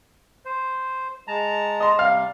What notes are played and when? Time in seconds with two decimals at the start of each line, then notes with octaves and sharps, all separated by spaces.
0.45 C5
1.28 G#3 A5 A#5
1.80 D#5 C6
1.99 C3 G3 F5 F6